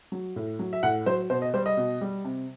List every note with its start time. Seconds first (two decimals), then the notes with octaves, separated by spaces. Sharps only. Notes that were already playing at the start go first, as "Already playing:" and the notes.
0.12 F#3
0.36 A2
0.59 F#3
0.73 E5
0.83 A2 F#5
1.06 F#3 C5
1.30 B2 C5
1.42 D#5
1.54 G3 C5
1.66 D#5
1.77 B2
2.01 G3
2.24 C3